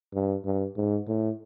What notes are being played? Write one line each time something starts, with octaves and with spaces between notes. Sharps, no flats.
G2
G2
G#2
A2